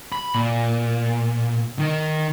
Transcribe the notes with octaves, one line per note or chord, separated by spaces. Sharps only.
B5
A#2
D#3 A#4